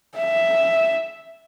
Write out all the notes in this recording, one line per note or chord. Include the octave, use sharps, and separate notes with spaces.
E5